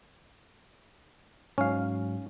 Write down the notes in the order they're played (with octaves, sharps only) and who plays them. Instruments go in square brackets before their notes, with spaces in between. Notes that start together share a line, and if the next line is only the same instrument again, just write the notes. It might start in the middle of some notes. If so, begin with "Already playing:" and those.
[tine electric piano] G#2 F#3 [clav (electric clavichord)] C#4 F5